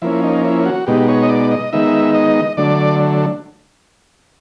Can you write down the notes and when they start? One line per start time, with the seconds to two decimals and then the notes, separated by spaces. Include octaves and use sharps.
0.02 F3 A#3 C#4 E4
0.23 D#4
0.45 E4
0.66 F#4
0.87 B2 G#3 B3 D#4 G4
1.08 C#5
1.23 D#5
1.29 D5
1.51 D#5
1.73 D#3 G#3 B3 D#4 E5
2.14 D#5
2.57 D3 F#3 A3 D4 D5